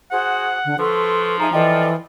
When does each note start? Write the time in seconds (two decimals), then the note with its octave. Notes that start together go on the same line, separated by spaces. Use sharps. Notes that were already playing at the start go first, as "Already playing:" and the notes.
0.11 F#4 G#4 C5 F#5
0.65 D3
0.79 F3 A4 B4 C6 C#6
1.40 D#4 G#4 E5 F5 A#5
1.53 E3 F4 A4 D5 D#5 G5